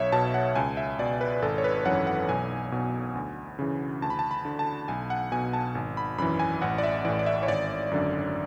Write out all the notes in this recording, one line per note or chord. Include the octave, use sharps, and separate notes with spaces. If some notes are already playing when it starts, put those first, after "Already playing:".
Already playing: B1 C#5 E5
B2 A5
F#5
C#2 G#5
E5
B2 D5
B4
G#1 A4
C#5
B4
F#2 E3 F#5
F#5
B1 G#5
B2
D2
C#3 E3
D2 A5
B5
A5
B5
D3
A5
B1 G#5
F#5
B2 G#5
A5
G#1
B5
F#2 E3 B5
G#5
A1 F#5
D5
E5
A2 E3 D5
D5
E5
C#5
G#1 D5
F#2 D3